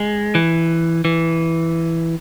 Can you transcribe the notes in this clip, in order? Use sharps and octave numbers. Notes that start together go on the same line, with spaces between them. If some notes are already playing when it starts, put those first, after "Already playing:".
Already playing: G#3
E3
E3